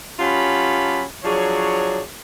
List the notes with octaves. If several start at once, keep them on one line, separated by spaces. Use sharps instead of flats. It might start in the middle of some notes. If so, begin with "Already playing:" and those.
F#3 C#4 F4 G4 A5 B5
F3 F#3 D4 G#4 C#5